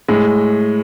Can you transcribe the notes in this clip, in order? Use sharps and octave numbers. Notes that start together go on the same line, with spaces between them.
A2 G#3